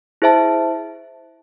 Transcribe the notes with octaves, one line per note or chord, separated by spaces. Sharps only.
E4 G#4 C5 E5 A5